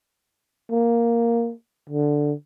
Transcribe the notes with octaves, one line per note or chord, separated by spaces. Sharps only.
A#3
D3